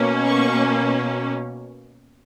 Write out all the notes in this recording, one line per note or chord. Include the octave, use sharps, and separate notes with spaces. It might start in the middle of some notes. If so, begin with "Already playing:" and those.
Already playing: B2 A#3 C#4
C#6